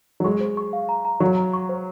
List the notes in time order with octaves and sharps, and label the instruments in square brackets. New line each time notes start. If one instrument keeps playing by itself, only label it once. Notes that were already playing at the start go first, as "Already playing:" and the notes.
[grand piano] F#3
[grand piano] G#3 [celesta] C#6
[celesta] C5
C#6
F5
A#5
A#5
[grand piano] F#3 [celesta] C#6
[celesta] A#5
C#6
C5